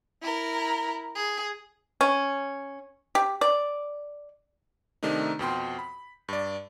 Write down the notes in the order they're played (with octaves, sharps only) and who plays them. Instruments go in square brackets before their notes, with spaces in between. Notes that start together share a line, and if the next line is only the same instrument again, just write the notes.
[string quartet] E4 A#4
G#4
[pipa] C#4
G4
D5
[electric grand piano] C3 D#3 A3 D4 D#4
F2 B2 G5 C6
B5
G2 D5